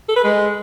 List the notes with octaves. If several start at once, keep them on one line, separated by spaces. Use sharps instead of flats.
A4
B4
G#3